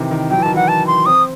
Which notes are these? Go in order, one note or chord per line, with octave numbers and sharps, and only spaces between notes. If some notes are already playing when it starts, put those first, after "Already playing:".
Already playing: C3 D#3 E3
D#3
F#3 G5
E3
D#3 A5
E3 F#5
A5
C6
C4 D#6